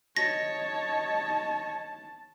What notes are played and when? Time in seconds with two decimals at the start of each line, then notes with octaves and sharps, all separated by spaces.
0.17 C#5 D#5 A5 A#6